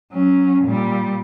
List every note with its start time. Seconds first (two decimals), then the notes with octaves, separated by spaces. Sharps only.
0.13 F#3 C#4
0.65 A#2 G3